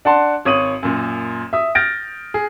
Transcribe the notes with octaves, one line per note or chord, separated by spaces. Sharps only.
D4 F#5 A5 C6
G#1 C#5 D#6 D#7 F#7
F#2 A#2
E5 D#6
F6 G6 A6 A#6 D7
G#4